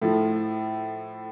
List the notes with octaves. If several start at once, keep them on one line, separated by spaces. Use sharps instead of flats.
A2 F3 A4